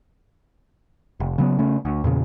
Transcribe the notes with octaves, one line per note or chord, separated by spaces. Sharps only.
F1
C#3 F#3 B3
C#3 A3 C#4
D2
E2 A#2 C#3